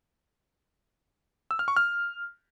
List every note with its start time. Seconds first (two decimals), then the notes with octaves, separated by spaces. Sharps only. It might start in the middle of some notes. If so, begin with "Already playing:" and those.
1.51 E6
1.59 F6
1.68 C#6
1.76 F6